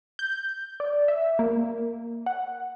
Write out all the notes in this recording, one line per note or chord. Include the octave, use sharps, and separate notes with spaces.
G6
D5
E5
A#3
F#5